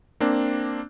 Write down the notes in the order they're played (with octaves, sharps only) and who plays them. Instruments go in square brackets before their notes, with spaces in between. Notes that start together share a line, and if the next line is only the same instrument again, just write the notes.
[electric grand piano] A#3 C4 D4